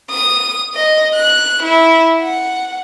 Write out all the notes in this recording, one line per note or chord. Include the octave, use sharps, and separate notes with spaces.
D#6
D#5
F#6
E4
F#5